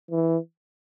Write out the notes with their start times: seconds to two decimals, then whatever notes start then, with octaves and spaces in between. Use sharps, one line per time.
0.11 E3